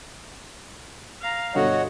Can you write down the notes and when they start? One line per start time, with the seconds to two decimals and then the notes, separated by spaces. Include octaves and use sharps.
1.22 F5 A#5
1.55 G2 B2 D3 F#4 C#5 D#5 F#5